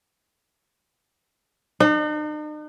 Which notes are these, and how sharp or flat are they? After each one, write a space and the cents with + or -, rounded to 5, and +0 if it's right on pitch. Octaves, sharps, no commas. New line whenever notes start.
D#4 -45